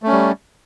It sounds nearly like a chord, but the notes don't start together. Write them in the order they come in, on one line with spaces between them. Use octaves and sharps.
A3 C#4 G3